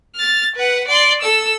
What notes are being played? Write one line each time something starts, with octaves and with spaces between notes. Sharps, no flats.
F6 A6
B4 F#5
D5 C6
A4 E6